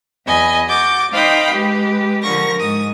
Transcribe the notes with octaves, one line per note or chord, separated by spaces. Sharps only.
E2 D#5 G#5 B5
F#4 D6 G6 A6
D#4 C5 F5 G5 B5 D#6
G#3 G4 B4
D3 F3 A#4 C#6 A#6
G#2 D#6